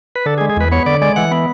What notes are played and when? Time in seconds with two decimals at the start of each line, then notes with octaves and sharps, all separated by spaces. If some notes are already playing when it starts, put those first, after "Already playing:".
0.16 B4
0.26 D3 A4
0.38 G#4
0.41 G#3
0.50 G#4
0.57 E2 B4
0.72 B3 C#5
0.86 D3 D5
1.02 G#3 D5
1.16 E3 F#5
1.32 B3